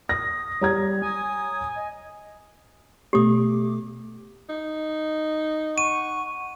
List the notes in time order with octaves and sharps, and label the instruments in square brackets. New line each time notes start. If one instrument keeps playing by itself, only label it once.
[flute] D#6 [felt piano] A#6
[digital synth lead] G3 [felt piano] C#5 A#5 G#6
[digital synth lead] G#5 [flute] D#6
[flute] D#5
[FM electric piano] B2 A3 D6 [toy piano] G4 D#6
[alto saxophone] D#4
[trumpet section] F#5 C#6 [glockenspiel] D#7